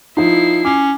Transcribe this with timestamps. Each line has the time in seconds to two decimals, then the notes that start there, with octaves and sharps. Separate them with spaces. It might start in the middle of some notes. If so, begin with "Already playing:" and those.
0.17 F3 D#4 E4 C7
0.65 C#4 D6